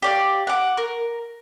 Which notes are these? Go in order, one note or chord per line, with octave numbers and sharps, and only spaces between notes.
G4 D5 F5
F#5 D6
A#4